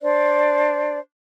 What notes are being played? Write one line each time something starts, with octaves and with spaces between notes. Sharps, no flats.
D4 C5 D5